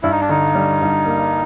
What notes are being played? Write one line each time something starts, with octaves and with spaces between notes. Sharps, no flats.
G2 E4
D#4
D4
D3 D#4
G3
G2
A#3